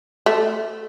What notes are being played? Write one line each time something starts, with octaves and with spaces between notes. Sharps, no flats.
A3